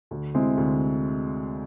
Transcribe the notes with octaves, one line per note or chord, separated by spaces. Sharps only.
D2
C3 G#3 C4 E4
D2